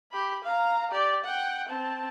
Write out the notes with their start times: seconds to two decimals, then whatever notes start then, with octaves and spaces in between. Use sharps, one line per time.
0.12 G4 B5
0.44 F5 A#5
0.91 G4 D5
1.24 F#5 G5
1.69 C4 A5